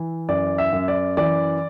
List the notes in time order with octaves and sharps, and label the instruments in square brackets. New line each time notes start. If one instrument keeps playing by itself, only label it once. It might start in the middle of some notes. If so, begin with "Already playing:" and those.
Already playing: [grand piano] E3
F#2 D5
E5
F#2
D5
E3 D5